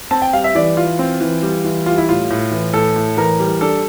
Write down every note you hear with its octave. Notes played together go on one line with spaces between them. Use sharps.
C4 A5
G5
G3 F5
E5
E3 D5
E3 F4
C4
E3
G3
E3
G3 F4
E4
A2 F4
A2
E3
A2 A4
A2
E3 A#4
G3
D4 A4